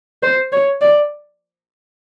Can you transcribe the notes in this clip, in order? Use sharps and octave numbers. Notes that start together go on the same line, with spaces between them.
C5
C#5
D5